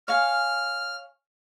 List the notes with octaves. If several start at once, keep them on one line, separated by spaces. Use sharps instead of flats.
C#5 F5 G#5 F6